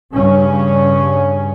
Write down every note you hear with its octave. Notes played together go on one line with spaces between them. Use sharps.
G2 C#3 C#4